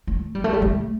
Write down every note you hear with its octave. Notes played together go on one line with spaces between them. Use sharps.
A3
G3
A3
G3
A3